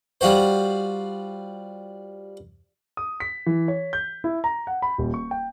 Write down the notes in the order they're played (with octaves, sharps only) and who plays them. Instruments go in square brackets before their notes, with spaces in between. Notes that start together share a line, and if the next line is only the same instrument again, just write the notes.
[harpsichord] G3 F4 F#4 C5
[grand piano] D#6
B6
E3
C#5
G6
E4
A#5
F#5
B5
D#1
C#6
G5